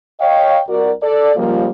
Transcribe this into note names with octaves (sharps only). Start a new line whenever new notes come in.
C#5 D#5 F5 G5
C2 F#4 A#4 D5
A4 D5
C#2 F3 G3 A#3